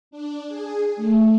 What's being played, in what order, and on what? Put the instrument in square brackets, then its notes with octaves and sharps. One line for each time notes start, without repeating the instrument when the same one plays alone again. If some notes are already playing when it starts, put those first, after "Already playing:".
[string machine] D4
G#4
A3